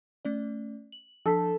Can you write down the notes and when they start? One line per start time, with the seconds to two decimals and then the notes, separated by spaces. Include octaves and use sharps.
0.25 A3 C#4 D5
0.92 F#7
1.26 F3 D4 A4 B6